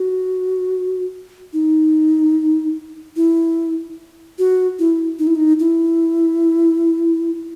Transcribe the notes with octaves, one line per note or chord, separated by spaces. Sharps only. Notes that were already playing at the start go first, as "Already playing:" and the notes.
Already playing: F#4
D#4
E4
F#4
E4
D#4
E4
D#4
E4